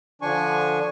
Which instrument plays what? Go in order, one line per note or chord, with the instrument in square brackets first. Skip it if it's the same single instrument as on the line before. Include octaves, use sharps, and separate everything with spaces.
[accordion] D3 F3 D4 G#5 C#6